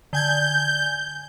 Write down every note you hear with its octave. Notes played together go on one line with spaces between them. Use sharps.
D3 G#5 G6 G#6